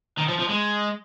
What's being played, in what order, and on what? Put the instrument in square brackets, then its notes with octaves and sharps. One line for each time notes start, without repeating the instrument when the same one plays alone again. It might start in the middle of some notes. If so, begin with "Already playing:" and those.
[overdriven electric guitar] D#3
F3
F3
G#3